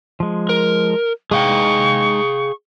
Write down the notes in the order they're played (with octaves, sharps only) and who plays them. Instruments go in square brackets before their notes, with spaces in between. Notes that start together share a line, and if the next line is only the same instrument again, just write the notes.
[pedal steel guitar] F3 G#3
[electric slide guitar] A#4
[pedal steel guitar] G#3 D#4 [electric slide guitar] G#4 F5 G5 [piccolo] C#6